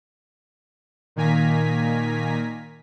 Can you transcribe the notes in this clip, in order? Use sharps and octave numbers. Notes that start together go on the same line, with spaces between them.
A#2 D#3 A#3 G#5 A#5 B6